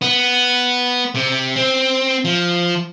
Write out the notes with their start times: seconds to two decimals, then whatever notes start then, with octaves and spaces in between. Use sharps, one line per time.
0.02 B3
1.15 C3
1.56 C4
2.25 F3